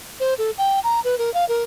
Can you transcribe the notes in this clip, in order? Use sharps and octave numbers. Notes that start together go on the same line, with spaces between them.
C5
A4
G5
A#5
B4
A#4
F5
A#4